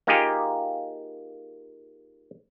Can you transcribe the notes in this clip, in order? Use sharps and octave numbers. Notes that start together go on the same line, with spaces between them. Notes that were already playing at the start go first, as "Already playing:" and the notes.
A#3 D#4 F4 G4 G#4